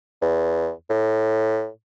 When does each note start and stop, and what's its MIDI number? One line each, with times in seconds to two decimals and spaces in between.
0.22 0.70 40
0.90 1.68 45